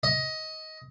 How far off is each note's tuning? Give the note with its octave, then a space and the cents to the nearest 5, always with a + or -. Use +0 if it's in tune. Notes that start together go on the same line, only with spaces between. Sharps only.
D#5 +15